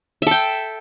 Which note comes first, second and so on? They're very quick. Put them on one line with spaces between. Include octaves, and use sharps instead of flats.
E5 A4 G5